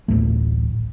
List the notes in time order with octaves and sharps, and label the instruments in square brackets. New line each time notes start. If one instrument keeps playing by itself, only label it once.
[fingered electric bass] D1 A1 E2 A3